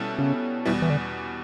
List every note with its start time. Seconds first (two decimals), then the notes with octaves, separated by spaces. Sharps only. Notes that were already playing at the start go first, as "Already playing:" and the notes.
Already playing: B2 G3 C#4 E4 A4
0.19 C#3
0.66 E2 B2 E3 G3
0.82 E3
0.90 D3